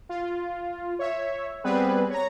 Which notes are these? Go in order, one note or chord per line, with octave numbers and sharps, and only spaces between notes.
F4
C#5 E5
G3 B3 C4 G#4 B4
C#5 A#5